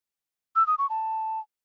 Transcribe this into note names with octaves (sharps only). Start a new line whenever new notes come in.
E6
D#6
C#6
A5